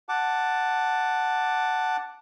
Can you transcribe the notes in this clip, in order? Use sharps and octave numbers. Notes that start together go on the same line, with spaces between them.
F#5 A5 D6